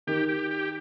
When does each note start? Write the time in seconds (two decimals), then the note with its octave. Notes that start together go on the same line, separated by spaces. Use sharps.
0.07 D#3 G4
0.29 G4
0.51 G4